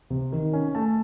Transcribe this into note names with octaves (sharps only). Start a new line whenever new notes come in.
C3
D#3
C#4
A3 A5